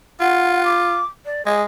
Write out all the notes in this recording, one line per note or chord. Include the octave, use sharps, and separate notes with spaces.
F4 F#5
D6
D5
G#3 G#4